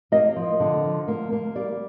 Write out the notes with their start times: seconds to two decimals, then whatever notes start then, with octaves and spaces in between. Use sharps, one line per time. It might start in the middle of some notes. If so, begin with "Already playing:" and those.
0.12 A#3 D#5
0.36 F3
0.60 D3
0.84 F3
1.08 A#3
1.32 A#3
1.56 G3 D5